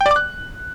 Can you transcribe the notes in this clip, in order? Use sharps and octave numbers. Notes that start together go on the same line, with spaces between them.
G5
D5
D6
F#6